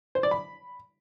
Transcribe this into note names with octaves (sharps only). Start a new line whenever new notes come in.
C5
D5
B5